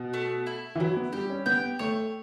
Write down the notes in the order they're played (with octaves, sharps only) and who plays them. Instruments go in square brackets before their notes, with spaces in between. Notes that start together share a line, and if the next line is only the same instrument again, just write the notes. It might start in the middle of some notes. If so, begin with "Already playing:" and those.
Already playing: [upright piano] B2
[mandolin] A3
E4
[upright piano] E3
[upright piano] F#3 [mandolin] E4
[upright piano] B3
[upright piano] G3 [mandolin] G4
[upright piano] C#4
[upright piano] B3 [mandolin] G5
[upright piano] A3 [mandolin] C#5